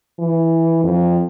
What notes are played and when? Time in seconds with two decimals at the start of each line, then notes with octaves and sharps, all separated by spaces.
0.19 E3
0.84 F2